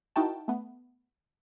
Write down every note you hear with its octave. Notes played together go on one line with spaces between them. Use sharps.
D#4 E4 F#4 A#4 G5 A5
A3 B3